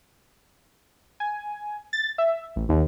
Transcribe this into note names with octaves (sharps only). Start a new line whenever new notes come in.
G#5
A6
E5
A1
D#2